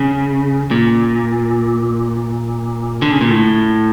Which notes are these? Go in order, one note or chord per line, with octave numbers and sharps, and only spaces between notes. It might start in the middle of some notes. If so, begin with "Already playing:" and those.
Already playing: C#3
A#2
D3
C#3
A#2
A2